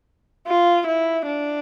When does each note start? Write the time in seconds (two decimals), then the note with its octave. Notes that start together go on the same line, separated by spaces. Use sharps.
0.47 F4
0.87 E4
1.26 D4